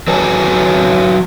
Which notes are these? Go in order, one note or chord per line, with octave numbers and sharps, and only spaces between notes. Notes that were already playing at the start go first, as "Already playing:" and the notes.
F#3 B4 C#5 G#5 A5